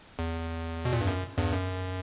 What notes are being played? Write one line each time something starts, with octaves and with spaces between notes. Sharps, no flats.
E2
B2
A#2
G2
F#2
E2 G2
F#2